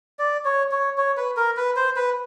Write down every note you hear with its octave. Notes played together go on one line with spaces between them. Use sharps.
D5
C#5
C#5
C#5
B4
A#4
B4
C5
B4